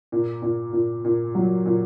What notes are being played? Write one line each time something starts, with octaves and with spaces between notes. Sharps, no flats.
A#2
A#2
A#2
A#2
F#3
A#2